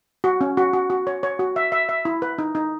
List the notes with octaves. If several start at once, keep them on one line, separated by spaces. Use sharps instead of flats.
F#4
C#4
F#4
F#4
F#4
C#5
C#5
F#4
E5
E5
E5
E4
B4
D#4
D#4